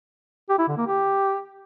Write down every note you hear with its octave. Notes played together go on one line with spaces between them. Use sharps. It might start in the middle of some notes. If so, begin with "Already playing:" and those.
G4
E4
D3
A#3
G4